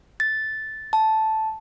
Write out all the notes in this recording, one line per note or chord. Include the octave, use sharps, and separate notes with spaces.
A6
A5